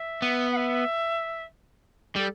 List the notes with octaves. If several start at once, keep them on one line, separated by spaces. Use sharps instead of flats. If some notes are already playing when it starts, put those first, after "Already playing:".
Already playing: E5
B3
F#5
E5
G3 A4